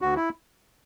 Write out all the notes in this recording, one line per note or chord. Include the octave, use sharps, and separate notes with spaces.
D2 F#4
E4